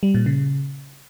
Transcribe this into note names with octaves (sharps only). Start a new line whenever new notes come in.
G3
A#2
C#3